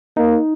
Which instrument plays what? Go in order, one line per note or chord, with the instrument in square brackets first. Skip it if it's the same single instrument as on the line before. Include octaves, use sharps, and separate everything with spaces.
[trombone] A#3 [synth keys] D#4